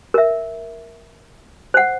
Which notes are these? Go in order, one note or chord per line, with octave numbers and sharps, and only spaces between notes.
A#4 E5
C5 F#5